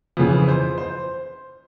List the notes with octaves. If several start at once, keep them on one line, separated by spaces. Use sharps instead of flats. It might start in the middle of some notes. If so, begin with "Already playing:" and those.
F2 C#3 E3 B4
C5
C5